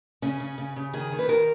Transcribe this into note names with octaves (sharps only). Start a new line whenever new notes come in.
C#3 C#4
C#3
C#3
C#3
D#3 G#4
D#3
B4
D#3 A#4